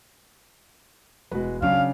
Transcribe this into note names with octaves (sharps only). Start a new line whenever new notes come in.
E1 G#3 F#4 B4
C#3 F#3 C#4 D4 F5